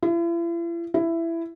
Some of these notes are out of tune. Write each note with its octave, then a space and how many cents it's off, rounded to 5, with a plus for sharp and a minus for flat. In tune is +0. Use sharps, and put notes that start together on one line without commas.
E4 +45
E4 +15